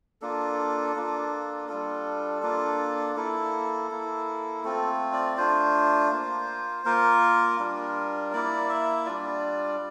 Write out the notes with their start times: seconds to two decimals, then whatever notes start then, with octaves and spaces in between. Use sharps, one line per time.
0.21 A#3 D4 F4 A4
0.95 A#3 D4 F4
1.68 G3 D4 F4 A4
2.42 A#3 D4 F4
3.16 A#3 E4 A4
3.91 A#3 E4
4.63 A3 C4 F4 A4
5.13 D5
5.37 A3 D4 F4 C5
6.12 A#3 F4
6.85 A#3 F4 A#4
7.59 G3 D4 F4
8.33 A#3 E4 D5
8.69 E5
9.06 G3 D4 F4 D5